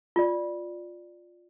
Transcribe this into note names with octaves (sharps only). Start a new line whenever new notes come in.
F4 D5